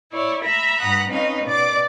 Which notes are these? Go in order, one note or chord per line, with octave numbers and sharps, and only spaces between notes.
E4 C#5 D5
E5 A#5 B5
G2 F#5 A#5 B5 D#6 F#6
C4 C#4 D#4 B4 D#5 F5
B2 D5 D6